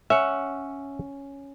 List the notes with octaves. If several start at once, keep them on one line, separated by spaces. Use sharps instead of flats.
C#4 E5 F#5